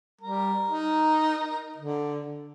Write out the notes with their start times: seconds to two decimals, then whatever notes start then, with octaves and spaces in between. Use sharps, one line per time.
0.21 G3 A#4
0.68 D#4
1.77 D3